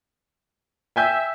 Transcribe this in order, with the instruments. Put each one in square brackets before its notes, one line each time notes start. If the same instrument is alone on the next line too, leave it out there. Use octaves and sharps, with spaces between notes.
[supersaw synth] E5 [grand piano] G5 G#5 G6